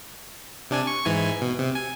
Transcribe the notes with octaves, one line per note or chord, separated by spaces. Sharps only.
C3 D4 G#5
C#6
G#2 E3 G#5
B2
C3
G#5